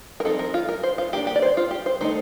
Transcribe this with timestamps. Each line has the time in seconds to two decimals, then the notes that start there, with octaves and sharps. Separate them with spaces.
0.20 A#4
0.25 F3 C4 D#4 A4
0.39 A#4
0.54 F4
0.69 A#4
0.83 C5
0.98 F4
1.13 D#3 A#3 D4 G4
1.27 G4
1.36 D5
1.42 C5
1.57 F4
1.71 G4
1.86 C5
2.01 D#3 A3 D#4 C5